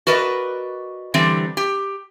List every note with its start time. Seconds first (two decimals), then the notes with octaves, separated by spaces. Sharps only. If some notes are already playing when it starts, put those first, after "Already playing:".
0.07 F#4 A#4 B4 D5 D#5
1.14 D3 E3 G3 C4
1.57 G4